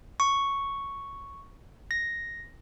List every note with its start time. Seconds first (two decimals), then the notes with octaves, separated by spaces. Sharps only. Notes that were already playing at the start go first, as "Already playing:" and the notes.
0.20 C#6
1.91 A#6